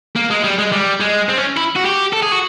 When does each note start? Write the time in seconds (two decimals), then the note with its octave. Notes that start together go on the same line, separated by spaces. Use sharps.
0.16 A#3
0.31 G#3
0.44 G3
0.58 G#3
0.72 G3
1.00 G#3
1.29 C4
1.37 C#4
1.57 E4
1.76 F#4
1.85 G4
2.13 A4
2.22 G#4
2.32 F#4